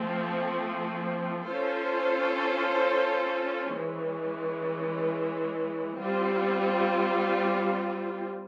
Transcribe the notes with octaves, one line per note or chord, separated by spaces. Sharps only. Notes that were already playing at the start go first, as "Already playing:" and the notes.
Already playing: F3 A3 C4
C#4 F4 A4 C5
E3 G#3 C#4
G3 C4 F4